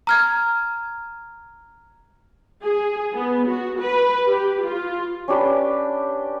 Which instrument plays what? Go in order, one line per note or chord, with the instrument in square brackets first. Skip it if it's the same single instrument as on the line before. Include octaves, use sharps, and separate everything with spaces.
[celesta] A#5 F6 G#6
[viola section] G#4
B3
F#4
B4
G4
F4
[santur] C#4 D4 G4 B4